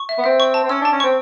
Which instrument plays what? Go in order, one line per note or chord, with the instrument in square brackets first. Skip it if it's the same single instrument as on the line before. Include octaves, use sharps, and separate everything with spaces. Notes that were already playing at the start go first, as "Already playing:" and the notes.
Already playing: [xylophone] C#6
E5
[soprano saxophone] B3
[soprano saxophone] C4 [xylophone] E5
[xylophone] C#6
A5
[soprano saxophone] C4
[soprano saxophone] C#4 [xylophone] E6
[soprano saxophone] D4 [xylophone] A5
[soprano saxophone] C#4
[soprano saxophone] C4 [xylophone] C#6